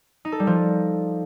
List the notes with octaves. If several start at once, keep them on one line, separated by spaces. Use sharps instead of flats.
D#4
A4
G3
F3